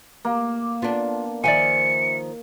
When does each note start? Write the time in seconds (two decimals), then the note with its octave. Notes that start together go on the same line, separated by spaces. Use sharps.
0.25 A#3
0.82 B3 D4 F4
1.44 D#3 F3 D5 E5 G#5 C#7